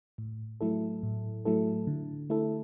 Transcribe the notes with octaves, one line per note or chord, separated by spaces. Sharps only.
A2
F#3 A3 E4 A4
A2
F#3 A3 E4 A4
D3
A3 E4 A4